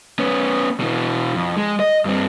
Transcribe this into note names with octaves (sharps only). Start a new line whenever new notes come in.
B3 C#4
B2 E3
F2
G#3
D#5
G2 C4